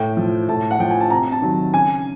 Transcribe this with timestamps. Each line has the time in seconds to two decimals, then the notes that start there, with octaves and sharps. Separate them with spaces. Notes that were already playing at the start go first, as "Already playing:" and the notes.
Already playing: A2 G5
0.17 F3
0.48 A2 A5
0.71 F#5
0.79 F3 G5
0.91 G#5
1.01 A5
1.10 C3 A#5
1.32 A5
1.42 D#3 F#3
1.73 C#3 G#5